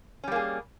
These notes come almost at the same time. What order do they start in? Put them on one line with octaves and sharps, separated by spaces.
C#4 G3 A#3 G#4